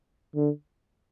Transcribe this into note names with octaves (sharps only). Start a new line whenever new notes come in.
D3